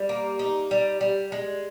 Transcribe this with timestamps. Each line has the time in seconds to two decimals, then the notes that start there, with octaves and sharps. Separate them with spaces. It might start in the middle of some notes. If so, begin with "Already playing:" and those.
Already playing: G3
0.09 A#3
0.39 D#4
0.71 G3
1.01 G3
1.32 G#3